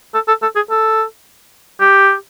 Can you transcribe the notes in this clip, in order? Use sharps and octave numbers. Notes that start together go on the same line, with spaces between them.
A4
A4
A4
G#4
A4
G4